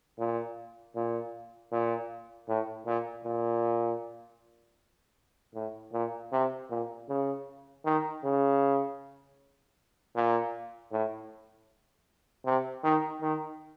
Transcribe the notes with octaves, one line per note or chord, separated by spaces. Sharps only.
A#2
A#2
A#2
A2
A#2
A#2
A2
A#2
C3
A#2
C#3
D#3
C#3
A#2
A2
C3
D#3
D#3